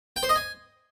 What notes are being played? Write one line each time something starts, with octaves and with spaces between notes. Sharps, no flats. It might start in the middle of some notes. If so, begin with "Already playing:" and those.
G5
C5
D#5
G#5